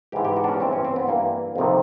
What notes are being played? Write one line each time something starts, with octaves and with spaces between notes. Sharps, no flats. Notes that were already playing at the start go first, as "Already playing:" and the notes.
G#2 E3 G4
G4
F#4
D4
C#4
G2 E3 C4
C#4
C4
B3
G2 E3 A#3
F2 C3 D#3